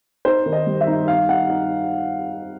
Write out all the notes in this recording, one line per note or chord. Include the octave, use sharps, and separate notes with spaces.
D#4 C5
D#3
D#5
G3
E5
D#4
D#4 F5
D#4 F#5
D#4